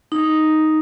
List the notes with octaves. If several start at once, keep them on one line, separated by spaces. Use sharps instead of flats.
D#4